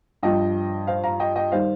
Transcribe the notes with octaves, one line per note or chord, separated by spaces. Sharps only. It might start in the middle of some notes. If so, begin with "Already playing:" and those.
G2 F3 D#5 G5
C5 F5
F5 A#5
D#5 G5
D#5 G5
D#3 G3 C5 F5